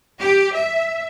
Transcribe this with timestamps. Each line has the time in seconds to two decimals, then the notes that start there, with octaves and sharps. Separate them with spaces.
0.20 G4
0.54 E5